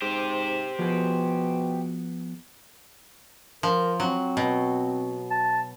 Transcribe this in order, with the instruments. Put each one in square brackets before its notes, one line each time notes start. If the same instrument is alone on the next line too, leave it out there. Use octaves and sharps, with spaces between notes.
[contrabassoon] G#2 [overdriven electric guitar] G4 C5
[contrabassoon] B2 [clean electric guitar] F3 B3 G#4
[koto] F3 [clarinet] A#4
[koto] F#3 [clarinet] C4
[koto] B2
[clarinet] A5